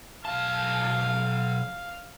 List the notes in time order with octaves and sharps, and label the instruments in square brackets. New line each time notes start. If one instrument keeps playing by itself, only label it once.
[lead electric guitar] B1 A5 [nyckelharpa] F5